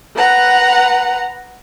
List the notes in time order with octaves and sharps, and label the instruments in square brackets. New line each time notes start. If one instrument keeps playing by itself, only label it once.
[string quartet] B4 F#5 A#5